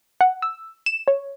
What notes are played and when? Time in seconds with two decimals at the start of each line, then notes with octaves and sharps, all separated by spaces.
0.21 F#5
0.42 E6
0.86 E7
1.08 C#5